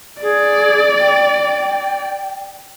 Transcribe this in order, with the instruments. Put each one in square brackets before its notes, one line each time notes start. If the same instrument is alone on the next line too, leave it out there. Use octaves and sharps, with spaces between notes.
[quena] G#4 [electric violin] D5
[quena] G5